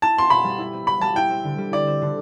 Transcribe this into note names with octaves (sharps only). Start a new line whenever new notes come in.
E4 A5
C4 C6
B2 B5
G3
E4
C4
B2 B5
G3 A5
E4 G5
C4
D3
G3
E4 D5
C4
D3